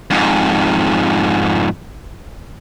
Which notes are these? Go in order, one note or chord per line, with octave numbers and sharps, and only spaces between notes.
F2 G#2